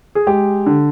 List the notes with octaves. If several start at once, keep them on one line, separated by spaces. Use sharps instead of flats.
G#4
G#3 G4
D3